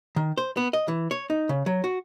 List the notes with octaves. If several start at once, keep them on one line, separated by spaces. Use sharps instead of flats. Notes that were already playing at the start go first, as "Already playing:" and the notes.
D#3
C5
B3
D#5
E3
C#5
D#4
C#3
F#3
F#4